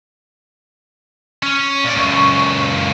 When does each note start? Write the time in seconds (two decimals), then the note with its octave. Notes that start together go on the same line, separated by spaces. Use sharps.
1.43 C#4
1.85 A#2 D5
1.96 C#2 F#2 C#6